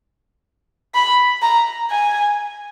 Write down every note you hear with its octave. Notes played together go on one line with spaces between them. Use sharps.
B5
A#5
G#5